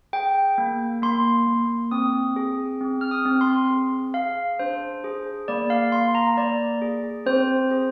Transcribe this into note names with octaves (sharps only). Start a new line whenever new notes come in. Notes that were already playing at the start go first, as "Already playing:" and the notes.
G#4 G5
A#3
A#3 C6
A#3
C4 D#6
G#4
C4
F6
D#6
C4
C6
G#4
G#4 F5
D4 C5
G#4
A#3 D5
F5
A#3 C6
A#5
A#3 D5
G#4
C4 C5
G#4